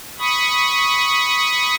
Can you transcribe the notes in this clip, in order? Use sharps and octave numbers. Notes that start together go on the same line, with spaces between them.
B5 C#6 D#6